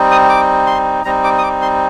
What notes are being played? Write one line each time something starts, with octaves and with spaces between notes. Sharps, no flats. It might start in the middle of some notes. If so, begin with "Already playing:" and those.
Already playing: G3 C4 D#4
D#6
D6
C6
G3 C4 D#4 A#5
D6
D#6
D6
C6